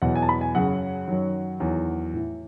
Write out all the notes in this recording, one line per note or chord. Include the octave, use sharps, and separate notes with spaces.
E2 B2 F#3 F#5
G#5
A5
B5
G#5
F#2 C#3 F#3 F#5
F#2 D#3 F#3
E2 D#3 F#3
A2 E3